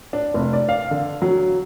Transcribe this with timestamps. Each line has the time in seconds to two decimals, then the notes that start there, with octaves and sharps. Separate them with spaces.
0.13 D4
0.34 F1
0.53 D5
0.69 F5
0.91 D3
1.22 F#3